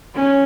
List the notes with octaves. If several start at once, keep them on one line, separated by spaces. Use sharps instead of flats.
C#4